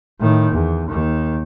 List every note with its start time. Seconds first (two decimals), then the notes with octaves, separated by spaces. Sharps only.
0.20 A2 D#3
0.52 E2
0.89 D#2 D#3